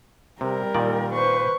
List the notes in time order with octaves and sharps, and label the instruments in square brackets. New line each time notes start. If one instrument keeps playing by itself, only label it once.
[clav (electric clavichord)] C3 [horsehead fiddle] G3 A#4
[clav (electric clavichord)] A#2 D#3 D5
[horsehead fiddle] B4 C5 [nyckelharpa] C#6